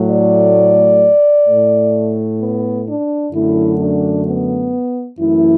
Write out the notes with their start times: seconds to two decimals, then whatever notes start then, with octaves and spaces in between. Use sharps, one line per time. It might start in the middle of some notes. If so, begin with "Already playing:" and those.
Already playing: A2 F#3 A3
0.09 D5
1.48 A2 A3
2.40 B3
2.86 D4
3.32 F#2 D3 F#3 A3 E4
3.79 D4
4.25 B3
5.18 F#2 E3 A3 E4